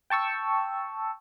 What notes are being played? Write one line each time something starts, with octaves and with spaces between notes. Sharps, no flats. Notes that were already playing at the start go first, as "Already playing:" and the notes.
G5 A5 C#6 E6